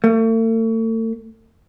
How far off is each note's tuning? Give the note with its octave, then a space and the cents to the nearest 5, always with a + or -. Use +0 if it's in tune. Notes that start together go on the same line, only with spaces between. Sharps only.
A3 +40